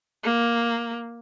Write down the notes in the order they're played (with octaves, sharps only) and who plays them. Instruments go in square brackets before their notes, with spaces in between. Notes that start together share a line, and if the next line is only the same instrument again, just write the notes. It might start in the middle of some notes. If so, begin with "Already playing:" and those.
[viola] A#3